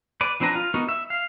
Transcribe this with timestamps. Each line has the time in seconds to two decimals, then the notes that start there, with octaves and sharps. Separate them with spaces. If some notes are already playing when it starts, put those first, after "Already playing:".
0.21 B4 D5
0.40 F3 C4 D4 B4 A#5
0.55 F4
0.74 B3 D#4 F#4 A#4
0.89 E5
1.10 F5